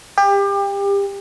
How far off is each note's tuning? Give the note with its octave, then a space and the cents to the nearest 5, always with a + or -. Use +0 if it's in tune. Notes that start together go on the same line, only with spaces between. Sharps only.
G4 +30